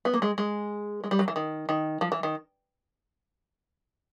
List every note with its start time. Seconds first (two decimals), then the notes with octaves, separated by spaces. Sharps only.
0.05 B3
0.14 A#3
0.22 G#3
0.38 G#3
1.04 G#3
1.11 G3
1.19 F#3
1.28 E3
1.36 D#3
1.69 D#3
2.01 F3
2.12 E3
2.23 D#3